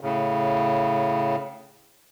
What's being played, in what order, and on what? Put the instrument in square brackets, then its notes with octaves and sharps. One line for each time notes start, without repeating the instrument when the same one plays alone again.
[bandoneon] A2 C#3